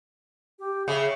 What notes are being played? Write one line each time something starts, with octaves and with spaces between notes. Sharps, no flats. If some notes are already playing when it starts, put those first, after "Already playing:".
G4
C#3 E5